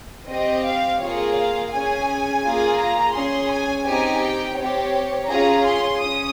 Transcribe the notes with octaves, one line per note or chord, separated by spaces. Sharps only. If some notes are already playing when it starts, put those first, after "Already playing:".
C4 G4 D#5
F5
A#3 F4 G#4 C#5
F5
C#4 G#4 G#5
A#3 F4 G#4
A#5
C#4 G#4 C6
G#5
C4 D#4 G4 G#5
G5
C4 G4 C#5
C#4 F4 G#4 A#5
C6
C#4 D#6